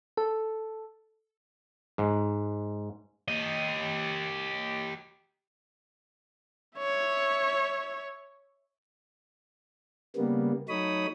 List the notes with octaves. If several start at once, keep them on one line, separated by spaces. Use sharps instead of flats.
A4
G#2
G4 D#5
C#5 E5
C#3 G3 A#3 B3
F#3 A3 D#4 C#5 B5 D#6